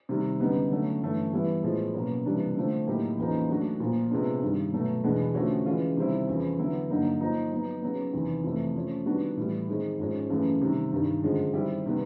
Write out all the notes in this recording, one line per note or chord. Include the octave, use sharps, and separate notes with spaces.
C3 D#3 G3
F#2 D3 G3 B3 D#4
D3 F#3 A3 C#4
G2 E3 A3 C#4
E3 G3 B3 E4
A2 F3 G#3 B3
B2 F#3 A#3 C#4
C3 E3 G3 A#3 D4
D3 F3 A3 C4
A2 F#3 A#3 D#4 G4
E2 C#3 F3 A#3 D#4
F#3 A3 D4 F#4
A#2 F3 A#3
C3 F3 G#3 B3 D4
G2 D#3 G3
B2 F#3 A3
E2 B2 G#3 B3 D4
D3 F3 A3 C#4 F#4
C#3 E3 G#3 C#4 F4
C3 D#3 G3 C4 E4
E2 C#3 F3
D3 F#3 B3 E4
G2 D3 F#3 A#3 D#4
F3 A#3 D#4
F#3 B3 D#4
C#3 F#3 B3
E2 C3 D#3
F2 C3 E3 A3
F3 A3 C#4
D#3 G3 B3 D4 F#4
A2 E3 G3
D#3 G#3 C4
G#2 F3 G#3 C#4
F#2 C#3 E3 A3
C3 D#3 G3
G2 D#3 G3
F#2 D3 F3 G#3
D#3 G3 C4 E4 G4
C3 D#3 G3 B3